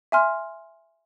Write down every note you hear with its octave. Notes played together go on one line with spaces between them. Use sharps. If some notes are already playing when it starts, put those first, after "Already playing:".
E5 G#5 C6 F6